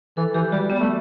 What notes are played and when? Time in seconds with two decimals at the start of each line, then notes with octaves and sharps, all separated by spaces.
0.17 E3 A4
0.34 E3 G4
0.52 G3 F#4
0.70 G3 B3
0.80 A3